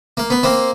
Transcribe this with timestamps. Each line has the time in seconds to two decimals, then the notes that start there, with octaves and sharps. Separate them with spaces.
0.17 A#3
0.30 B3
0.43 A#3 C4